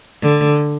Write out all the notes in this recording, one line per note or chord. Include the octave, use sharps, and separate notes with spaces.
D3